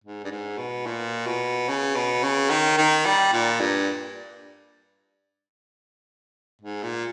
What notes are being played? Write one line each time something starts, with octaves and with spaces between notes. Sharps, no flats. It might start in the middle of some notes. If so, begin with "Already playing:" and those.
G#2
G2
G#2
B2
A#2
B2
C#3
B2
C#3
D#3
D#3
G3
A#2
G2
G#2
A#2